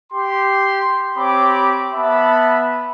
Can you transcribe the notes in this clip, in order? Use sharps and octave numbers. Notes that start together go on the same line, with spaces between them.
G4 C6
C4 G4 C#5 B5 D6
B3 E5 A5 B5